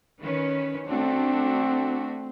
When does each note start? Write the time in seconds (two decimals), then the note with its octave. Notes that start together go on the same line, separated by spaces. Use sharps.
0.21 D#3 C#4 B4
0.88 A3 C4 D4 F#4